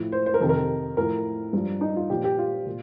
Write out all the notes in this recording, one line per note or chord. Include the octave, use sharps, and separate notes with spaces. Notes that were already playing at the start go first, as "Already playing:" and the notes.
Already playing: A2 F3
C5
C5
A#4
F2 C3 D#3 A4
A#4
A2 F3 A#4
G2 F3
D#4
F4
A#2 F3 G4
G4
F4
A#2